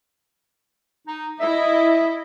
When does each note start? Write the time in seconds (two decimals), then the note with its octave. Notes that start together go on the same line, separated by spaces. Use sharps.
1.08 D#4
1.41 E4 D#5 E5